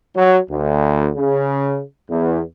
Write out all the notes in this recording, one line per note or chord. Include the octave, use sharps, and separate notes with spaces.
F#3
D2
C#3
E2